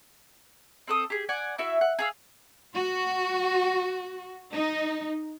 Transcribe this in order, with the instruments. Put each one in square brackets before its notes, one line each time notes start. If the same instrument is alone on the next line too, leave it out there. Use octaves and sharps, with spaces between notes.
[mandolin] C4 A4 D#6
G4 G#4
D5 F#5 G#5
E4 F#4 E5
F#5
G#4 F5 E6
[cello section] F#4
D#4